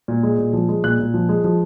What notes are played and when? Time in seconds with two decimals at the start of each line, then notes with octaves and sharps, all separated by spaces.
0.08 A#2
0.23 G#3
0.38 A#2
0.53 F3
0.69 G#3
0.84 A#2 F#6
0.99 A#2
1.14 F3
1.29 G#3
1.44 F3